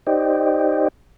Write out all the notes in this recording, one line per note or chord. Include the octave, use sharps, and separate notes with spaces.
D#4 G4 C5 D5 D#5 G5